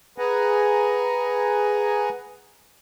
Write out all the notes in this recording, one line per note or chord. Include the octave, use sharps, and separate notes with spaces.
G#4 B4 F#5 G#5 A#5